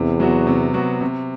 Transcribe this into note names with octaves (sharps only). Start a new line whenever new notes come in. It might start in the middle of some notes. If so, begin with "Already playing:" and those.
Already playing: E2 C3
F#3 B3 F#4
C3
F#3 B3 F#4
C3